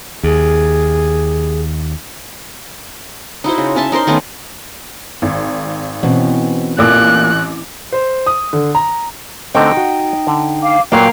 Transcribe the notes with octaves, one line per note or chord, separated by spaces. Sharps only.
D#2 G#4
D#4 E4 F#4 C5
C#3
C#4 E5 A5 C6
D#4 A#4 C5 C6
D#3 A3 B3 C#4
G#1
B2 E3 C4 C#4
A1 A#2 A#3 D6 F#6
C5
D#6
D3
A#5
D3 A3 C4 D#4 G5
F#4
D3
F5 D6
A#2 F#3 A#3 F5 G5